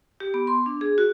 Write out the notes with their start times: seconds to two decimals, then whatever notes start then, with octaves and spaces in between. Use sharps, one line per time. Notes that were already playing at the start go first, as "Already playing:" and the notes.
0.20 G4
0.34 B3
0.47 C6
0.66 D4
0.81 G#4
0.98 F#4